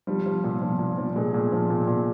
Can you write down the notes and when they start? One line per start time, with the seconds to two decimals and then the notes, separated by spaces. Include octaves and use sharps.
0.07 F3 G3
0.26 F3
0.44 A#2
0.62 F3
0.79 A#2
0.98 F3
1.16 A#2 G#3
1.34 A#2
1.52 F3
1.70 A#2
1.88 A#2